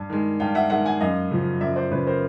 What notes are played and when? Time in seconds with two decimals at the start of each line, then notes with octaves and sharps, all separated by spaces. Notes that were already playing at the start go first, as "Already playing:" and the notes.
Already playing: G2
0.10 D#3 G#3
0.40 G2 F5 G5
0.55 E5 F#5
0.70 D#3 G#3 E5 F#5
0.86 F#5 G#5
1.01 F#2 D#5 F5
1.31 C#3 F3
1.61 F#2 D5 E5
1.76 C5 D5
1.91 C#3 F3 B4 C#5
2.07 A#4 C5